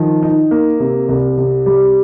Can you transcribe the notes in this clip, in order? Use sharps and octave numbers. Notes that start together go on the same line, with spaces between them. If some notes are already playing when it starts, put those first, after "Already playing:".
Already playing: D#3 F3
D#4
A#3
C3
C2
C3
G3